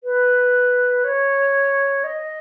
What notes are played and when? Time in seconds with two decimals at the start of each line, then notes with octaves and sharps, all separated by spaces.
0.04 B4
1.04 C#5
2.04 D#5